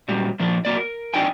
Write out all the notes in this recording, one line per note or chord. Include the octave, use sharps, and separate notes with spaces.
A#2 F#3 G3
A#2 D#3 F3 D4
F#3 A#3 D5
A#4
D4 D#4 D5 G5 G#5